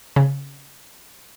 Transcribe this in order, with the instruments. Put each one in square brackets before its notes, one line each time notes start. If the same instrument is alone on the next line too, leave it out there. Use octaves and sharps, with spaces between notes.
[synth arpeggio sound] C#3